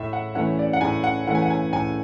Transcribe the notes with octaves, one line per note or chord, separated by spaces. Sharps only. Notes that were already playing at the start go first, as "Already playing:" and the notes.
Already playing: A2 E5
F#5
E3 A3 C#4 F#5
D5
F#5
A2 G#5
F#5
E3 A3 C#4 F#5
G#5
F#5
G#5
A2 G#5